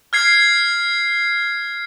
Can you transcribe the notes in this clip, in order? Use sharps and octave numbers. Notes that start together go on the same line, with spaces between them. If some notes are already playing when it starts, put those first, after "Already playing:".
F6 G#6 C7